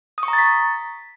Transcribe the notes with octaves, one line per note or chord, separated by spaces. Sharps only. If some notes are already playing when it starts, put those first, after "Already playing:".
D#6
C#6
A#5
A6
B6